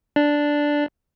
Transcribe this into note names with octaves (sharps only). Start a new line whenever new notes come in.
D4